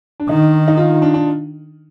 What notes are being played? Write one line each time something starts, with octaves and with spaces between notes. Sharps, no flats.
D4
D#3 D#4
D#4
F4
D4
D4